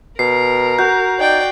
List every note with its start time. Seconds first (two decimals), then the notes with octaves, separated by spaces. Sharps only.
0.19 B2 A#4 C7
0.79 F#4 G6
1.20 D#4 D5 G5